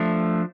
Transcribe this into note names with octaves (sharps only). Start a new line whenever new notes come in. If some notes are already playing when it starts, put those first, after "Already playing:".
Already playing: F3 A3 D4